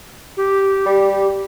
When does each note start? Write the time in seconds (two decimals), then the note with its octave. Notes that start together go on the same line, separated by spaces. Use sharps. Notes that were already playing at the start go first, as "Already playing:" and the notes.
0.37 G4
0.86 G3